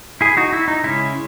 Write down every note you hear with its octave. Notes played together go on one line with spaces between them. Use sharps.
E4 G#4
D#4 F#4
E4
D#4
C#3 G#3 C#4 E4